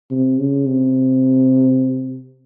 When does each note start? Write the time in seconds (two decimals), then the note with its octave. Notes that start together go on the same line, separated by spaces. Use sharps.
0.11 C3
0.39 C#3
0.66 C3